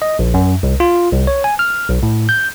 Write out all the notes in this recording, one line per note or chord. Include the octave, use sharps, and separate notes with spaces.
D#5
A#1
F#2
C2
F4
C2
C#5
G#5
F6
B1
A2
G6